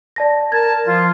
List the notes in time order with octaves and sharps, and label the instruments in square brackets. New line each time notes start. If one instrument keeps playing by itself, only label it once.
[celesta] D5 A5 A#6
[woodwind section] A#4 A5 [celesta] G#6
[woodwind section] F3 F4